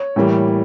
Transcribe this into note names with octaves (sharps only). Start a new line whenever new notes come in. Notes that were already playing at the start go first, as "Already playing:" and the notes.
Already playing: C#5
A2 E3 G3 A#3